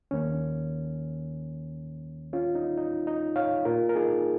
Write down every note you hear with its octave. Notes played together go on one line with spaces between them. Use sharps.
D#2 D#3 A#3 C#4
C#4 F4
D#4
D#4
D#4
C#5 F5
A#2 A#3 F4 A#4
A#4
D#4 G#4